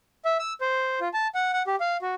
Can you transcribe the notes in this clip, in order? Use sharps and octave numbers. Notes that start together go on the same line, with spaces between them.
E5
E6
C5
F4
A5
F#5
F#5
G4
F5
F#4